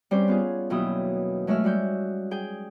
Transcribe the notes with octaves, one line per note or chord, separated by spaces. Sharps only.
G3 C4 C#4 G4 C5
B3 F4 G#4
D#2 B2 F#3 E4 G5 D#6
F#3 G#3 A3 F#4 E5 F6
G3 G#3 F#4 G6
G#4 G5